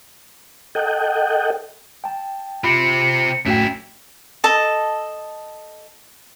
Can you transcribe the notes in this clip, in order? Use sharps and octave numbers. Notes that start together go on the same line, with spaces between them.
A4 D#5 F#5 G5
G5 A5
C3 C4 F4 B5 C#7
A1 F#2 A2 A3 C#4 E4 F#4 G5
A4 D#5 A5